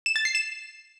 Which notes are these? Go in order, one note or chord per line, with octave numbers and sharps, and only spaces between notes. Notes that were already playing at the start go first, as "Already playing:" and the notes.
E7
A6
C7
E7